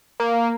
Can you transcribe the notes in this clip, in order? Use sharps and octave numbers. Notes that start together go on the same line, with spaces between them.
A#3